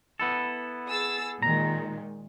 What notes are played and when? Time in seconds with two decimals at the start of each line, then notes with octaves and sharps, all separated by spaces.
0.20 B3 E4 A4
0.87 G#4 E6 A6
1.42 A#2 D#3 G#3 A#5